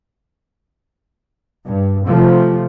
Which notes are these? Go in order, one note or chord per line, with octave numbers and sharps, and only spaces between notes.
G2
C3 F3 A3